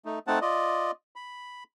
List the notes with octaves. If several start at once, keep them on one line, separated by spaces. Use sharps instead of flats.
A3 D#4
A3 C4 D#4 F#5 A5
F4 D5 D#5
B5